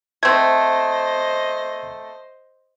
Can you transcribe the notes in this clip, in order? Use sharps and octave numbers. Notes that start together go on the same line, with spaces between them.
A3 C4 C5 D#5 G#6